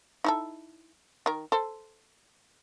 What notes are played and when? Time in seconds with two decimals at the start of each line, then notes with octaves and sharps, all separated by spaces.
0.24 D#4 E4 A4
1.26 D#3 A#4
1.52 A4 C5